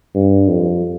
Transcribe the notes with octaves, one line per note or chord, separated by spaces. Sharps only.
G2
F2